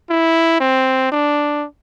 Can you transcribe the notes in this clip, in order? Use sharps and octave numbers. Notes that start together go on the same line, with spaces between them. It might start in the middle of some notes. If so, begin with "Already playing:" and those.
E4
C4
D4